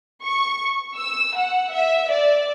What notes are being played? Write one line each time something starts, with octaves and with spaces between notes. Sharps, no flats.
C#6
E6
F#5
E5
D5